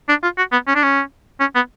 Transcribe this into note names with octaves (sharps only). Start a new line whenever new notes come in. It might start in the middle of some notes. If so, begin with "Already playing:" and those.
D4
F4
F#4
B3
C#4
D4
C#4
C#4
B3